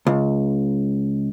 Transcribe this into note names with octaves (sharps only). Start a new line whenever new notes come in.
C#2